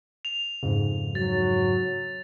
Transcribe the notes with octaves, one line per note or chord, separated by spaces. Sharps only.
F7
F2 G#2 C#3
F#3 A6